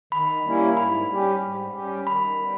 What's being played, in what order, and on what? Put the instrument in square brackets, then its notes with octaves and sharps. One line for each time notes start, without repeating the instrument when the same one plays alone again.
[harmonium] D#3 [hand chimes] B5
[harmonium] G3 A#3 C#4 E4
[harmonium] G#2 [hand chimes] B5
[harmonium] G3 C#4 G4
G#2
G3 C#4 G4
[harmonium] D#3 [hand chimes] B5
[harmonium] G3 B3